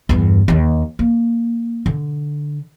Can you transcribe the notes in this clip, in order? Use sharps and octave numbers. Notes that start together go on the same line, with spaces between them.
E2 G2
D#2 D#3
A#3
D3